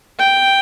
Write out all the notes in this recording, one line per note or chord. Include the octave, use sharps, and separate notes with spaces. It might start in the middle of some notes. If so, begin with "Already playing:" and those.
G5